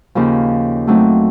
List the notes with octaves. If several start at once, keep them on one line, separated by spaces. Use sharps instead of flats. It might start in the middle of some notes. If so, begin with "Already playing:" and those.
D#2 C#3 F3
F#3 A3 C4 D#4